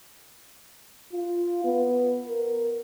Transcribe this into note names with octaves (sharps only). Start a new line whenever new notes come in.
F4
B3
A#4